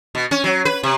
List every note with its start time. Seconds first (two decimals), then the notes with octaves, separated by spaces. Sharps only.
0.15 B2
0.31 C#4
0.44 F#3
0.65 B4
0.83 C3